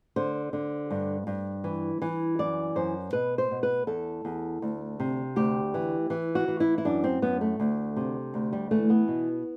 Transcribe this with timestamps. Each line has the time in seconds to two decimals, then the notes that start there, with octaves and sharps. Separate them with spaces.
0.16 D3 C5
0.53 D3
0.91 G2
1.27 G2
1.64 E3
2.02 E3
2.39 F#2 D5
2.76 F#2 C5
3.13 B2 B4
3.38 C5
3.51 B2
3.63 B4
3.87 E2 A4
4.25 E2
4.62 D2
5.00 C3
5.36 D2 G4
5.74 E3
6.10 E3
6.35 F#4
6.48 E3
6.60 E4
6.78 E4
6.85 F#2 D4
7.04 C4
7.22 F#2 B3
7.41 A3
7.60 D2
7.96 C3
8.34 D2
8.53 G3
8.71 E3 A3
8.90 B3
9.08 B2